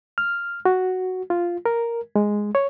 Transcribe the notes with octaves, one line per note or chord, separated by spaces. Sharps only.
F6
F#4
F4
A#4
G#3
C#5